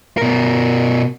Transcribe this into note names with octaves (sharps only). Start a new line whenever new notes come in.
B2 A#4